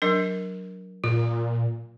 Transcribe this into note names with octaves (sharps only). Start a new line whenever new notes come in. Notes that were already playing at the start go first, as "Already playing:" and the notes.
F#3 D4 A#4
A#2 F4